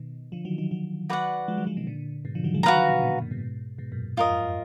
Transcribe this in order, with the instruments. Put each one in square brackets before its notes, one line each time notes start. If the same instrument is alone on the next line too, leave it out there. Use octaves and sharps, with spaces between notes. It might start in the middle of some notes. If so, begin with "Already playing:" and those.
Already playing: [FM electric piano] B2 D#3
D3 F3
D#3 F#3
D#3 F#3
D#3 F#3
[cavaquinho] F#4 B4 D5 F#5
[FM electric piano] F3 G#3
D#3 F#3
D3 F3
B2 D#3
A#2 D3
G#2 B2
D3 F3
D#3 F#3
F3 G#3
[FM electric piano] D#3 F#3 [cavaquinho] F#4 B4 F5 A#5
[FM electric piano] D3 F3
B2 D#3
A#2 D3
F#2 A#2
G#2 B2
G#2 B2
F#2 A#2
[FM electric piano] F2 G#2 [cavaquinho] F4 A#4 D#5
[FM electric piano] F#2